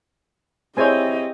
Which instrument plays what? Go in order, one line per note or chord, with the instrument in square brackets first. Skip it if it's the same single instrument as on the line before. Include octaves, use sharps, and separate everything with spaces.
[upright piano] C4 E4 C#5 [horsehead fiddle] G4 D#5 [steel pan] G#4 C5 G#5